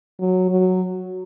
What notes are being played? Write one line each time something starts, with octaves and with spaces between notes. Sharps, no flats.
F#3
F#3